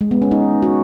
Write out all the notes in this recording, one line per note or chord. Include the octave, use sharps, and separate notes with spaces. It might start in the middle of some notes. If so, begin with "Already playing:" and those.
G#3
B3
C#4
D#4
F#4